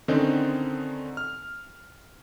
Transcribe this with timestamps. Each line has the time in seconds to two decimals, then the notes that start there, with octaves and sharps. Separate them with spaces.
0.08 D3 D#3 C4 C#4 D#4
1.17 F6